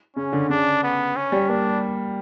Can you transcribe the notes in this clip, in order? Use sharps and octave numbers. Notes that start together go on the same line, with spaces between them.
C#3 C#4
D3
C#3 D4
B3
C#4
G3
A#3 D4